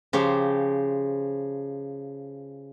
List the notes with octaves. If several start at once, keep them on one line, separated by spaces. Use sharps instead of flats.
C#3 F3 G4 C5